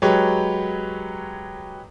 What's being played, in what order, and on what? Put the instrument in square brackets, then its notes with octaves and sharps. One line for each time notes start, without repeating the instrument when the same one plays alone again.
[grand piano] F#3 G#3 G4 B4 C#5